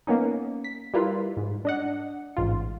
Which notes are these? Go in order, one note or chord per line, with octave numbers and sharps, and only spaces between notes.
A#3 B3 C#4 D#4
B6
G3 E4 F4 A#4 B4
G#2
D4 D#5 F#5
A1 G#2 F4